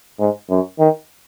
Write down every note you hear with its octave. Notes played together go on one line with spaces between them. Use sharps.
G#2
F#2
D#3